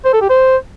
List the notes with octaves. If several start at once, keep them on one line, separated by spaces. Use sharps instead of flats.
C5
A4
G4
C5